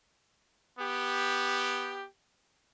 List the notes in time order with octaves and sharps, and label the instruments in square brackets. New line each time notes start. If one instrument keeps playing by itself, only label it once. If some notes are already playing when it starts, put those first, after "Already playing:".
[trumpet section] B3 G4